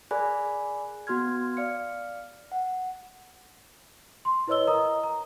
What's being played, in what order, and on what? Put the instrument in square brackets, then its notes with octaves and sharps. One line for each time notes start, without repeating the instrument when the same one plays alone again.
[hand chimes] G#4 A#4 D5 G#5 B5 F#6
B3 F#4 C6 F6 G#6
D5 F5 F6 C#7
F#5
[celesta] C6
E4 B4 C#5 D#5 E6 G7
A#4 D#5 A#5 D#6
A#5